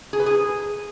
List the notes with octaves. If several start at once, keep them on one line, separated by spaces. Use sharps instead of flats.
G#4
B4
G#4